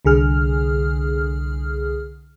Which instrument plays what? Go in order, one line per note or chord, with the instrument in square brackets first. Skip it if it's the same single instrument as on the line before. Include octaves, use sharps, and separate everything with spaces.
[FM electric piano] C2 D3 G#4 F6